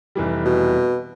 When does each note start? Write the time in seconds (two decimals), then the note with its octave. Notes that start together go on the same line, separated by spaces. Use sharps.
0.15 F1 E3 G3
0.45 B2